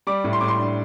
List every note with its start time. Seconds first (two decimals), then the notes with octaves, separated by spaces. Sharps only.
0.07 G3 D6
0.24 A2
0.33 C6
0.41 A2 D6
0.48 C6
0.59 D4